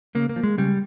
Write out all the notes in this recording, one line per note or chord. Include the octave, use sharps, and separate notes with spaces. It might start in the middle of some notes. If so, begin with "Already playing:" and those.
C#3 A#3
A#3
F3
G#3
C#3 G3